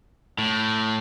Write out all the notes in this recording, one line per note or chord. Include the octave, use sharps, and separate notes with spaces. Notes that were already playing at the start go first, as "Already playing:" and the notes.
A2